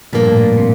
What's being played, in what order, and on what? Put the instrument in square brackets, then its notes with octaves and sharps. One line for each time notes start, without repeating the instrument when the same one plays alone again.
[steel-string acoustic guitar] G2 F3 A#3 D4 [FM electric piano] A#2
[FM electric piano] A2
A#2
C3